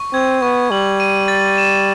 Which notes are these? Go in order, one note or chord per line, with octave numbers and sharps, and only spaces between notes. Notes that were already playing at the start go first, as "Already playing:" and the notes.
Already playing: C#6
C4 G#6
B3 C#6
G3 F#7
D#7
A6
E7